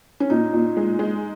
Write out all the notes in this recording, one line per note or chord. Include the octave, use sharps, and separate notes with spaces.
C#4
A#2 D#4
A#2
G#3
G#3